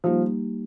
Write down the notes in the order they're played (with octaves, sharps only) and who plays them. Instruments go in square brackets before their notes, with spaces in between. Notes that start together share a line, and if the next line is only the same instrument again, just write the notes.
[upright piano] F3 [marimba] G3 A#3 D#4 G4